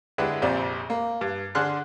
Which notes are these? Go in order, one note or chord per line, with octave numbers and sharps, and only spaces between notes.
D3 G#3 D4 E4 G4 B4
A#1 F2 C3 C5 D5
A#3
G2
D3 D4 G#4 C6 F6 F#6